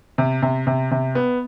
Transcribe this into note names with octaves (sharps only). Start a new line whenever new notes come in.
C3
C3
C3
C3
B3